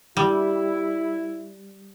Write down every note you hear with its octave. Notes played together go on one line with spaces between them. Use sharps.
G3 E4